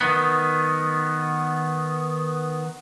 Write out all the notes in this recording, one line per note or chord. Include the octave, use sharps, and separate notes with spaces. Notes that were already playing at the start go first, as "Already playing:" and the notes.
D#3 B3